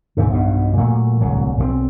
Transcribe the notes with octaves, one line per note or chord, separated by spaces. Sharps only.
D#2 G#2 C3
B1 G2 B2
A#2 F#3 G3 A3
D1 C2 F#3
B1 G#3 C4